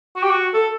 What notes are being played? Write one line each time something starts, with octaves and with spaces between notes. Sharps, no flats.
F#4
G4
F#4
A4